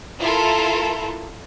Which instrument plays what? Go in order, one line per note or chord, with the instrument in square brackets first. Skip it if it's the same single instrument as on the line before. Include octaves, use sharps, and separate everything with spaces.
[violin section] E4 F4 A4 A#4